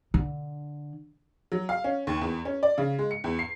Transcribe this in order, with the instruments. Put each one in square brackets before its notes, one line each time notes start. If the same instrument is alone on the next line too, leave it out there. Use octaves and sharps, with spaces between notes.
[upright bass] D3
[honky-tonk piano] F#3
F5
C#4
D#2
E2
C#4
D5
C#3
G#3
C#7
E2
C7